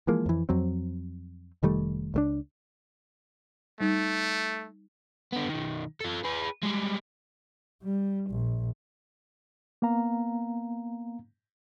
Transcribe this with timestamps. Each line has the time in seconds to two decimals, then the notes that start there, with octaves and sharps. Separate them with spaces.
0.07 E3 F3 G#3 A#3
0.26 F2 E3
0.49 F2 F#3 C4
1.63 F1 D#3 G3 A3
2.14 C#2 A3 D4
3.80 G3 A3 D#4
5.33 D3 B3
5.49 B1 D#3
6.00 F4 A4
6.24 G#4 B4
6.63 G3 G#3
7.83 G3
8.30 A#1
9.82 A#3 B3 F5 A#5